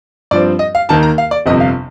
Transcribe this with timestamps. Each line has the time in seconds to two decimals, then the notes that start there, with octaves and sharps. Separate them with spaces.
0.31 G2 F3 C4 D5
0.59 D#5
0.75 F5
0.89 D#2 D#3 A#3 A5
1.03 A#5
1.18 F5
1.31 D5
1.46 G1 F2 C3 D#5
1.60 F5